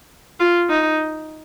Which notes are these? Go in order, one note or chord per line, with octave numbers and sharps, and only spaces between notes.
F4
D#4